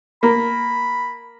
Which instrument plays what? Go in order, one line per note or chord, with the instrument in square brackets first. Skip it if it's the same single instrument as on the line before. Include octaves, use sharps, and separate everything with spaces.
[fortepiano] A#3 [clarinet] B5